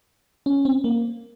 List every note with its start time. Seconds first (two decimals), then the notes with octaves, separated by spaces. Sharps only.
0.46 C#4
0.65 C4
0.84 A#3